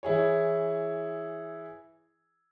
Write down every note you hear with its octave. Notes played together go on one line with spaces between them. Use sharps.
E3 E4 G#4 C#5